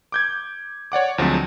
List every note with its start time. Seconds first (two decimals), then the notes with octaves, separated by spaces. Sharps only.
0.12 D6 G6 G#6
0.92 C#5 D5 F#5 D6
1.18 D2 F3 F#3 G#3 C4